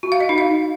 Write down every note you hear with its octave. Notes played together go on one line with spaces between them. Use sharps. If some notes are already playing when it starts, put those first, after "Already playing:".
F#4
F5
D#5
D#4
F5